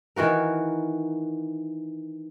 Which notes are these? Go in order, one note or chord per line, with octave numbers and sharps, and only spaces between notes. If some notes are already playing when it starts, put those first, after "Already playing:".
D#3 E3 F#4 A#4